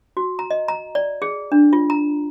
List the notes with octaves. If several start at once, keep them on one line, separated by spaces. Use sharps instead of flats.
F#4
A#5
D#5
A#5
D5
G#4
D4
F4
A#5